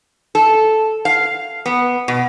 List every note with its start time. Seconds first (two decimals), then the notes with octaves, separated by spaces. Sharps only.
0.35 A4
1.05 F5
1.66 B3
2.08 B2